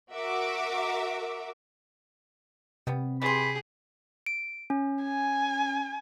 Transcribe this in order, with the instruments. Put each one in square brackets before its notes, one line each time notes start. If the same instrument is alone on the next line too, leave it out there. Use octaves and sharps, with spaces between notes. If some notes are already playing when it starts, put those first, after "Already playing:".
[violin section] F#4 A#4 E5 D6
[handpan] C3 [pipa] G3 B3
[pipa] E3 C6 [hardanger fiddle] G4 G#4 [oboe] B5
[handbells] D7
C#4
[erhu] G#5